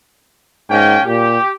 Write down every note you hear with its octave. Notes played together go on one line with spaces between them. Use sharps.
G#2 A#3 C#4 G5
A#2 G4